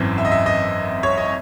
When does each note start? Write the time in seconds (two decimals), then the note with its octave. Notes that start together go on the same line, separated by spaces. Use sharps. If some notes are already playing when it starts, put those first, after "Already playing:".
Already playing: G#1 F#2 E3 C4
0.18 E5
0.25 D#5
0.32 E5
0.46 D#5
1.03 C#5
1.18 D#5